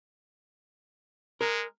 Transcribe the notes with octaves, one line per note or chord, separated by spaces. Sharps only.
G#3 A#4